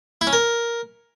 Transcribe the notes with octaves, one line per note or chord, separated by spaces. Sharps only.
E4
C#4
A#4